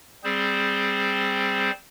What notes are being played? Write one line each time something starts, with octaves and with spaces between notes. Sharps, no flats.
G3 C4 G#4 C5